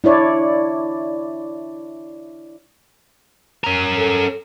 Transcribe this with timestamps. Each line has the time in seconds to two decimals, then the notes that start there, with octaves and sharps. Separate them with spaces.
0.04 D4 E4 C#5 D5
3.64 C#4 A#4
3.97 A4